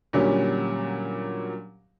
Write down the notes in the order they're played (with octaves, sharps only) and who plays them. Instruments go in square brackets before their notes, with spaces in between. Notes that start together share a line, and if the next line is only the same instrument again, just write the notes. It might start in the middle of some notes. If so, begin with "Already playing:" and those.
[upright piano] A#2 D3 F#3 G3 C#4